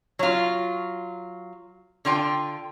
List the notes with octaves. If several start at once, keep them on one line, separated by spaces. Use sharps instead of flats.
F#3 F4
D3 F4 G5